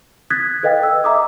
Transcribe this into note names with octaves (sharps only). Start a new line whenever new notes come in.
D#6 F#6 G#6 A6 B6
A4 B4 D#5 F5 G5
E6
D#5 E5 A#5 D6 D#6